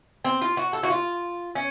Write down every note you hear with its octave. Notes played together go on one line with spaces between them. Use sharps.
C4
F4
F#4
A4
F#4
F4
C#4